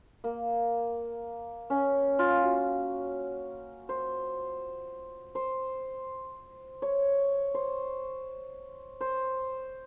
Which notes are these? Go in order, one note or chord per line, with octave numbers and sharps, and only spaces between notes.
A#3
C#4
F4
F#4
C5
C5
C#5
C5
C5